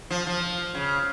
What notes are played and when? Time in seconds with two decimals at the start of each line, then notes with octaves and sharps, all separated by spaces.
0.11 F3
0.27 F3
0.75 C#3